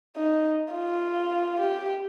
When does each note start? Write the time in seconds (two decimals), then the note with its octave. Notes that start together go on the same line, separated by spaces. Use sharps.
0.16 D#4
0.74 F4
1.60 G4